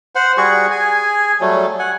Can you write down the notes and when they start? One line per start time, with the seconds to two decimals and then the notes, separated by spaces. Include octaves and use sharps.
0.15 C5 F#5
0.37 G3 F#4 G#4 C#6
0.71 G#4 G#5
1.41 F#3 G3 A3
1.79 F#5 G#5